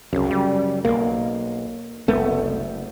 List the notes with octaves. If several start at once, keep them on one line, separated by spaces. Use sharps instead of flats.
C2 F#2 C#3
G3
B1 A#3
F#1 C2 A3 B3